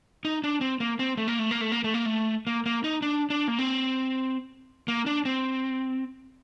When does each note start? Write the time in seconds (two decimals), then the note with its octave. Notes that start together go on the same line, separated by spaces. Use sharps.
0.25 D#4
0.44 D4
0.61 C4
0.80 A#3
0.99 C4
1.17 A3
1.28 A#3
1.39 A3
1.51 A#3
1.61 A3
1.72 A#3
1.84 A3
1.94 A#3
2.06 A3
2.47 A#3
2.66 A#3
2.84 D#4
3.02 D4
3.30 D4
3.48 A#3
3.59 C4
4.88 A#3
5.06 D4
5.25 C4